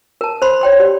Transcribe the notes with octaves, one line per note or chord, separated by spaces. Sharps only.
A#4 A5
C5 B5 C6
C#5 G5 C6
G4 D5